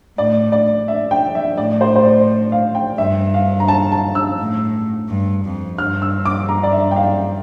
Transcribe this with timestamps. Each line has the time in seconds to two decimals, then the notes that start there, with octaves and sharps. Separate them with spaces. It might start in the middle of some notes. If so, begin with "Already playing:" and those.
0.18 A2 D5
0.52 D5
0.88 E5
1.11 G5
1.35 E5
1.57 A2 D5
1.81 C5
1.96 C5
2.05 D5
2.52 F5
2.75 G5
2.98 G2 E5
3.34 F5
3.60 A#5
3.68 A5
3.92 A5
4.15 E6
4.39 A2
5.09 G2
5.44 F2
5.78 G2 F6
6.02 E6
6.25 D6
6.49 A#5
6.63 D5
6.72 E5
6.91 G5
6.96 F5